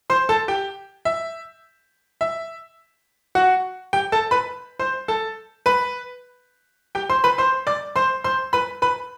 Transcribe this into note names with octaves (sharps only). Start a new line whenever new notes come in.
C5 C6
A4 A5
G4 G5
E5
E5
F#4 F#5
G4 G5
A4 A5
B4 B5
C5 C6
A4 A5
B4 B5
G4 G5
C5 C6
B4 B5
C5 C6
D5 D6
C5 C6
C5 C6
B4 B5
B4 B5